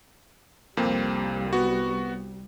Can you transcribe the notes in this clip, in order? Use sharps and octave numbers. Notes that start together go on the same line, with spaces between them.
C2 F2 G3 A#3 C4
B3 F#4